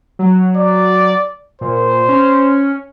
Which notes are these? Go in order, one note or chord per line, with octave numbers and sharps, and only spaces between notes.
F#3
D5
A#2 C5
C#4